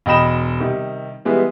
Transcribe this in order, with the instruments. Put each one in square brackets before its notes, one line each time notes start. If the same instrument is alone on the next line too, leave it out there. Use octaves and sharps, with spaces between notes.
[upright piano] E1 D#5 G5 B5 E7
C3 D#3 G3
E3 G3 G#3 B3